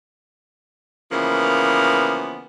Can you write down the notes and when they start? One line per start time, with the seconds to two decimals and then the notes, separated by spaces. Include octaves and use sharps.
1.12 C#3 E3 F3 A#3 B3